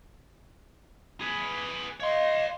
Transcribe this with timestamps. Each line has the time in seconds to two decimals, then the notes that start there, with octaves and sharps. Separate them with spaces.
1.21 G#4 B4
2.00 C#5 D#5 F5 C6